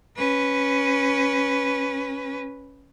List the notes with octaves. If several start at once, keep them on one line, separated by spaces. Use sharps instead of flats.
C#4 B4